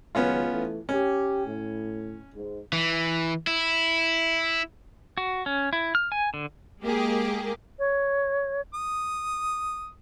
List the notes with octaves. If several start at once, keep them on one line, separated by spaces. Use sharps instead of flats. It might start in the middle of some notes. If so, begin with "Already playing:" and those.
C#2 D#3 F#3 B3 C#4 F4
E3 A3
C#4 G4
A2
G#2
E3
E4
F#4
C#4
E4
F6
G#5
D3
G#3 A#3 G4 G#4
C#5
D#6